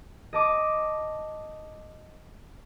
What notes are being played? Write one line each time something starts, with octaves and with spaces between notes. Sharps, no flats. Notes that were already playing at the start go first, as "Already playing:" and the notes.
D#5 A5 D6